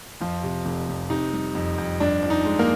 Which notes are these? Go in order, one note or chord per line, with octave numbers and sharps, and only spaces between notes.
F2 F3 F4
C3
F1
F1
C3 D#4
G3
F2
F2
G2 D4
F3
D#4
G#3
A#3 A#4